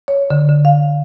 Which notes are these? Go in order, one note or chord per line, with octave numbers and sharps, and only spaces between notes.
C#5
D3
D3
F5